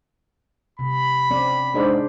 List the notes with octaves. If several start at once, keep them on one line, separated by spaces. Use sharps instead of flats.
C3 B5
C4 C#4 D5
G#2 D4 C5 D5